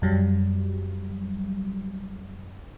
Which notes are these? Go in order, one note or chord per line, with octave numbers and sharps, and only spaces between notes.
F#2 F#3 G3